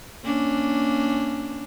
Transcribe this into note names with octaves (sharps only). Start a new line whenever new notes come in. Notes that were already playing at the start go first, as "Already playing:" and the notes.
A#3 C#4 D4